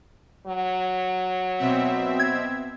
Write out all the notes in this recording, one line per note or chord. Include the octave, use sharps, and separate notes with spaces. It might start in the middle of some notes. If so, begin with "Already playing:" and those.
F#3
B2 C4 E5
G#6